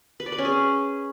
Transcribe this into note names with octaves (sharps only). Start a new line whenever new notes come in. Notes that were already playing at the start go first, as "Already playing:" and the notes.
B4
D5
B4
C#4
G#4